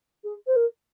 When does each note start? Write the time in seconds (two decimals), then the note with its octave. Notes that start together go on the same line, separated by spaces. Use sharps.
0.24 G#4
0.47 C5
0.55 A#4